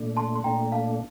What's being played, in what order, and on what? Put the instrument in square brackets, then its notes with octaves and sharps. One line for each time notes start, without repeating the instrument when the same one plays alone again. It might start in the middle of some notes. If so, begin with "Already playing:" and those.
Already playing: [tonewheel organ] A#2 A3 D4
[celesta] A5 C6
C6
[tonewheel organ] A#2 A3 D4 [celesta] G5 A#5
[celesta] F5 A5